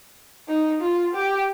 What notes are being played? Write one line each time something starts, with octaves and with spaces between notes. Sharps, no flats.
D#4
F4
G4